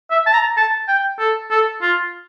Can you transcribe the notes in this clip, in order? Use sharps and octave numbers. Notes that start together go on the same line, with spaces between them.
E5
A5
A#5
A5
G5
A4
A4
F4